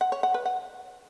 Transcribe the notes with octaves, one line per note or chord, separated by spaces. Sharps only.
F#5
C#5
F#5
B4
F#5